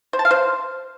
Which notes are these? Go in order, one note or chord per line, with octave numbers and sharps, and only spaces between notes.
C5
A5
F5
C5